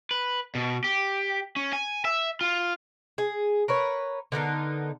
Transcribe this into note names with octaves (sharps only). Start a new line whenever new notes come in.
B4
B2
G4
C#4
G#5
E5
F4
G#4
A#4 B4 C#5
D3 B3 D#4 A#4